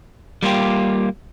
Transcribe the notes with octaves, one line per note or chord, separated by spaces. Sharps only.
G3 A#3 F4 G4